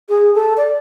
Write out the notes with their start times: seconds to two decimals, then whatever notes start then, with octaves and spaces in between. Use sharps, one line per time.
0.09 G#4
0.35 A4
0.57 D5